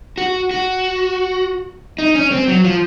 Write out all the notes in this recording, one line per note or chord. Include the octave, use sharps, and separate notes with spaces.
F#4
F#4
D#4
C#4
C4
F#3
F3